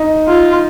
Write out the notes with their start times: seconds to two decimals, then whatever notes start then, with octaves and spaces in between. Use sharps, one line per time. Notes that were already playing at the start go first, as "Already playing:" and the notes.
Already playing: D#4
0.27 F4